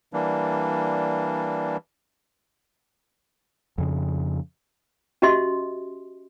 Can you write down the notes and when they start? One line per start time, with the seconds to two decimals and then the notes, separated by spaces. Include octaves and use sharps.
0.13 E3 G3 A#3 D4
3.78 F2 C#3
5.22 C#4 F#4 G4 D#5 E5 C6